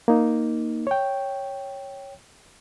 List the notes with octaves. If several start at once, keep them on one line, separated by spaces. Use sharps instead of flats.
A#3 D#4
C#5 G5